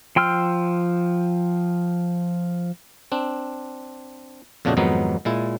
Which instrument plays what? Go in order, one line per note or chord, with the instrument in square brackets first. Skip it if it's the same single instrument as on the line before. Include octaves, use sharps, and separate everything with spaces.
[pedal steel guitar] F3 G5 C6 E6 F6
[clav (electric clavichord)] C4 D4
F2 A#2 C#3 D4 F#4 D#5
F2 G#2 D#3 F#3 B3 D#4
A#2 G#3 E4